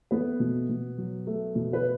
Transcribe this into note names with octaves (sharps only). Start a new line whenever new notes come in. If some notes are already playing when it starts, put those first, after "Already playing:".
A3 B3 B4
B2
B2
F#3
A3
B2
B4